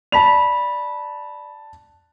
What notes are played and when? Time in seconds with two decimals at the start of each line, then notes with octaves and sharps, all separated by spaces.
0.12 D5 A5 B5 B6 F7